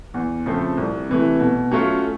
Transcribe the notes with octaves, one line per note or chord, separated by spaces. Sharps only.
E2
C#3 F3 A3 C4
C2
C3 E3 A3
B2
F#3 A3 C#4 F4